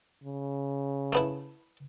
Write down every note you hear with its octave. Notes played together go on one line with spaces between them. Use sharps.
C#3
A3 B3 E4